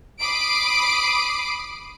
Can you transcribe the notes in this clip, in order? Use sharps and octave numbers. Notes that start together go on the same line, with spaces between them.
B5 D6 D#6 C7 D7